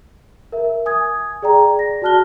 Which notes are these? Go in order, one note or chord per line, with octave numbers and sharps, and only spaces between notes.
A#4 E5
G#5 D#6 G#6
G#4 D5 G5 A#5
A#6
F#4 D5 A5 F6 F#6 G7